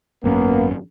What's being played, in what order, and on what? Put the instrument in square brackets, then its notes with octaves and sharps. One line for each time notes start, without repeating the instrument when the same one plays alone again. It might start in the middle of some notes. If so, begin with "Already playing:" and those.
[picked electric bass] G#1 F#2 C#4 [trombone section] A#3 B3